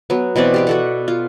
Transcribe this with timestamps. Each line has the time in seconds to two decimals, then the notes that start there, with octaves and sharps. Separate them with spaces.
0.10 F#3 B3
0.36 B2 E3 C4 D5
0.54 G4 B4 D5
0.67 F#4 A4 F#5
1.08 F4